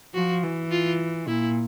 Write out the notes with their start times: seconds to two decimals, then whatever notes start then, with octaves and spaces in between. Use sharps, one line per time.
0.14 F3 F#4
0.43 E3
0.71 F4
1.28 A#2 E4